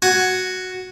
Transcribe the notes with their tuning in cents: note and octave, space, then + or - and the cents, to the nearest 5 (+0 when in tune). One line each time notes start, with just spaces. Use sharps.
F#4 +0 G#5 +10